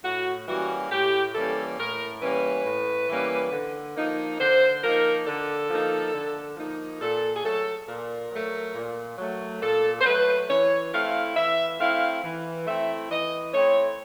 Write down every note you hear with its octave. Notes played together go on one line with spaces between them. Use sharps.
A2 F#4
E3 G3 A#3 C#4 F#4
A2 G4
E3 G3 A#3 C#4 A4
A2 A#4
E3 G3 A#3 C#4 B4
A2
E3 G3 A#3 C#4
D3
F3 A#3 D#4
D3 C5
F3 A#3 D#4 A#4
D3 A4
F3 A#3 D#4
D3
F3 A#3 D#4
A#2 A4
G#4
F#3 A3 A4
A#2 A#4
F#3 A3
A#2
F#3 A3
A#2 A4
C5
F#3 A3 B4
E3 C#5
A3 C4 E4 F5
E3 E5
A3 C4 E4 F5
E3
A3 C4 E4 E5
E3 D#5
A3 C4 E4 C#5